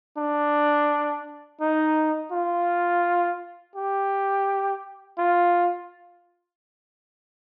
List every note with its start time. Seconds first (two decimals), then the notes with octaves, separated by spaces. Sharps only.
0.18 D4
1.61 D#4
2.32 F4
3.75 G4
5.18 F4